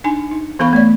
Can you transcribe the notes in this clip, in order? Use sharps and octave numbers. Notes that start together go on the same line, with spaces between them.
D4 D#4 G#5
D#4
E3 B3 A4 F5 B5 C#6
A3 C#5 D5